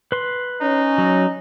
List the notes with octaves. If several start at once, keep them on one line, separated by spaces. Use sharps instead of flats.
B4 C6
C#4 D#4
F#3